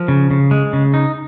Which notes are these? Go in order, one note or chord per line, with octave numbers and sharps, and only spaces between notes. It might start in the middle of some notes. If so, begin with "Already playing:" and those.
Already playing: F3 A#4
C#3
C#3
G#3
C#3
D#4